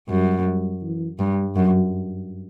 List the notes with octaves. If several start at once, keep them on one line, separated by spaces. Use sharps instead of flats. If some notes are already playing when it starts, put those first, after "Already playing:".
F#2 G3
G3
E3
G2 G3
F#2 F#3